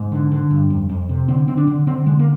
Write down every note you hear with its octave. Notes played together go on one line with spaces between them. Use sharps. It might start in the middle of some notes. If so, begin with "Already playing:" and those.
Already playing: G#2
D3
D3
G2
F2
F2
C3
D3 C4
D3 C4
D4
D3
D3 C4
D3 G#3
A#3